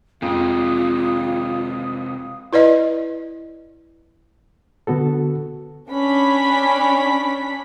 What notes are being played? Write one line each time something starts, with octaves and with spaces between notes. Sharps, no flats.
F2 C3 G#3 F4 F5 D#6
E4 B4 D5 D#5
D3 B3 F#4 A4
C#4 D4 B5 B6